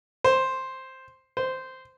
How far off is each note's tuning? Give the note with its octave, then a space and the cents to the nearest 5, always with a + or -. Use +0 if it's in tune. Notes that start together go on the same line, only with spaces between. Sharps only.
C5 +5
C5 -10